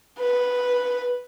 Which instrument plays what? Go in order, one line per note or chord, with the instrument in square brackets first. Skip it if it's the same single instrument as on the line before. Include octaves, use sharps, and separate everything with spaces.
[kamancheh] B4